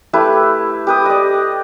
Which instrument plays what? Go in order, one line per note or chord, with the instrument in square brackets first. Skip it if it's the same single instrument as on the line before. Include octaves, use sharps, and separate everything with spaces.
[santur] A3 E4 G4 B4
G4 B4 D#6
D5 D#5